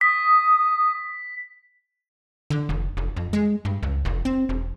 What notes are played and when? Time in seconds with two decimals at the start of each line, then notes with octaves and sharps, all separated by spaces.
0.01 D#6 B6
2.50 D3
2.69 F1
2.97 F1
3.17 F2
3.33 G#3
3.65 G2
3.83 C#2
4.05 F1
4.25 C4
4.49 E1